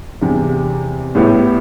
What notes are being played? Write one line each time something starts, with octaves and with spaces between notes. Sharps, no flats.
E2 C3 G3
A2 G3 B3 E4 G4